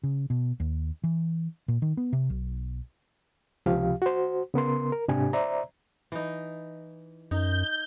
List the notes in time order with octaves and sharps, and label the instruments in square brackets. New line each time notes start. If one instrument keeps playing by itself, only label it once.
[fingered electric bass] C#3
B2
D#2
E3
A#2
D#3
B3
C3
B1
[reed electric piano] C#2 C3 F3 G4 F5
F#4 C5
C#3 B3 A#4 C6
A#4
G#2 C3 D4 G4 G#5
C5 D5 E5 A#5
[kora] E3 D#4
[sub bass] F#2 [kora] D#4 [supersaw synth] G6